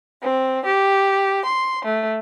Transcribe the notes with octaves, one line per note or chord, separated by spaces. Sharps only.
C4
G4
C6
A3